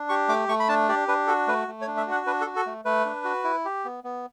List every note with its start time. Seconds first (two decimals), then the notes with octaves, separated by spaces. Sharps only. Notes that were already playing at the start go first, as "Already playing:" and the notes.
Already playing: D4
0.09 G4 C#6
0.29 A3 D6
0.49 A3 C#6
0.60 B5
0.69 D4 A5
0.89 G4 D5
1.08 D4 B4
1.27 F#4 A4
1.47 A3 B4
1.68 A3
1.81 C#5
1.87 D4
1.97 E5
2.07 F#4 F#5
2.26 D4 B4
2.41 A4
2.46 F#4
2.56 A4
2.66 A3
2.85 A3 B4
3.05 D4
3.24 F#4
3.44 E4
3.65 G4
3.85 B3
4.04 B3